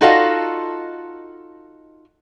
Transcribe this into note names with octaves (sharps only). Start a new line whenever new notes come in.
D#4 F4 F#4 A4 D#5 F5